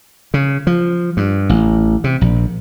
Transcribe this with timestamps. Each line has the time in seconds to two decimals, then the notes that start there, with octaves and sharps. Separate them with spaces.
0.34 C#3
0.67 F3
1.17 G2
1.49 A1
2.04 C3
2.21 A#1